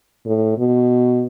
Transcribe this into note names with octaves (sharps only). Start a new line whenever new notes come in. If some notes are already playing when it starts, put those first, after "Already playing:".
A2
B2